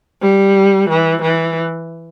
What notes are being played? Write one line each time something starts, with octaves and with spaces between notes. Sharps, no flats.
G3
E3
E3